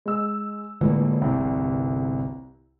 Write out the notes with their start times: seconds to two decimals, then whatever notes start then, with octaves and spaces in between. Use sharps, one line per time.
0.06 G#3 E6
0.81 A2 D3 E3 G#3 A#3
1.22 G1 C2 C3